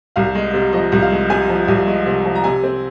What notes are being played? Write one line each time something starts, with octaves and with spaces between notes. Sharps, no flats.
C2 F5
G#3
C3
F3 D#5
C2
F5
G#3
C3 G#5
F3
C2
G#3
C3
F3
A#5
C3 G#5
C4